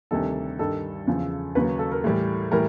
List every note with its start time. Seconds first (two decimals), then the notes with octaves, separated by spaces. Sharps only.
0.11 D2 C3 D#3 G3 A4
0.59 G2 D#3 G3 A4
1.07 E2 C#3 F3
1.55 D#2 C#3 F#3 B4
1.79 A4
1.91 A#4
2.04 A2 E3 G3
2.52 A2 E3 G3 A#4